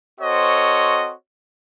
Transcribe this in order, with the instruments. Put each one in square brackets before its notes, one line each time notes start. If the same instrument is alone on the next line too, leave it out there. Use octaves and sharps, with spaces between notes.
[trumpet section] C4 F#4 A4 C5 C#5 D#5